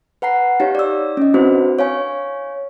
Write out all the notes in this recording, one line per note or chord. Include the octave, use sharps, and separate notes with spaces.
B4 F#5 A#5 C7
D#4 G4 C#5 F5
D5 E6
C#4 D#5
C4 D4 E4 F#4 B4 C5
C#5 F5 G#5 C#6